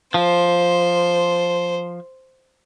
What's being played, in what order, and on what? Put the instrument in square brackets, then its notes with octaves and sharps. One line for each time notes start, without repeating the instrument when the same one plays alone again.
[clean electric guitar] F3 [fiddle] C5